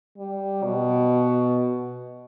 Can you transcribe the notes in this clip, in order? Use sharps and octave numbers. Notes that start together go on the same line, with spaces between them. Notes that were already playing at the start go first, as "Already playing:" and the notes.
G3
B2